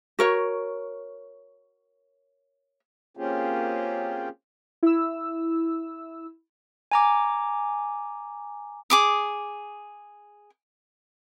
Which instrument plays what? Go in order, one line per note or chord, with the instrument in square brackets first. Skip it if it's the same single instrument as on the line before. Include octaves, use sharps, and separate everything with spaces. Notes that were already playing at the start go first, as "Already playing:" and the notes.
[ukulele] F#4 A#4 C#5
[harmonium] A#3 C4 C#4 F4 G4 G#4
[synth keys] E4 E6
[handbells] G#5 A#5 D6
[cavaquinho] G#4 D6 D#6